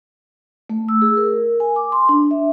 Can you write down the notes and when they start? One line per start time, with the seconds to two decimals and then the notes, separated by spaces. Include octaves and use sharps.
0.70 A3
0.89 E6
1.02 G#4
1.17 A#4
1.60 G#5
1.76 D6
1.92 C6
2.09 D4
2.31 E5